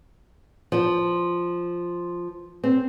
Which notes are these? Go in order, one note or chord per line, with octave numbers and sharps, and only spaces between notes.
F3
C4